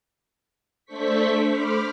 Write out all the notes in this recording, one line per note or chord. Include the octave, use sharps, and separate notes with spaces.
A3 D4 A4 C5 C#6 B6
C5 B5 D6 F6